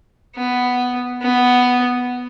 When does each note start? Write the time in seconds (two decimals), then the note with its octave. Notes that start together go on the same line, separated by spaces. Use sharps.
0.36 B3
1.22 B3